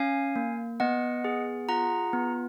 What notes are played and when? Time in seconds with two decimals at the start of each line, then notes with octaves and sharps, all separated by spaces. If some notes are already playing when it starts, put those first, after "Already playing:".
Already playing: C#4 F5 G#5
0.36 A#3
0.80 B3 D#5 F#5
1.24 G#4
1.69 F4 F#5 A#5
2.13 B3